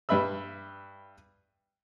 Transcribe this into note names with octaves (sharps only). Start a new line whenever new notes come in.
G2 B4 E5 B5 E6